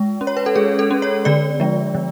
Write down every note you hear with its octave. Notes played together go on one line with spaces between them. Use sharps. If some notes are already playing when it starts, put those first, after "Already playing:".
Already playing: G#3
C#4
C#5
B4
A4
G#3 G#4
A4
C#4
C#5
D3 D5
F3 G#3
D3